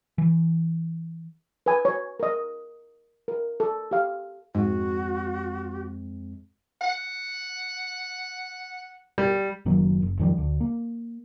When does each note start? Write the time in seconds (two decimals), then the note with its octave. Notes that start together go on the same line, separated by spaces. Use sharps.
0.18 E3
1.66 B4 G#5
1.85 C#5
2.20 A#4 D#5
3.28 A#4
3.60 A4
3.91 G4 F5
4.55 F2 G#2 G#3 C4 F#4
6.81 F#5
9.18 G3
9.66 F#1 D#3 F#3 A#3
10.02 F#1
10.19 F2 D#3 F3 G3
10.38 D2
10.61 A#3